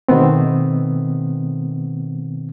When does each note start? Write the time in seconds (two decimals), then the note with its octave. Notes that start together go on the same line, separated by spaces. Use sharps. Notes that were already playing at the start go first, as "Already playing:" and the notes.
0.08 B2 D#3 A3 B3 C4